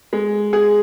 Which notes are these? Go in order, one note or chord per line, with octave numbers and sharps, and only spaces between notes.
G#3
G#4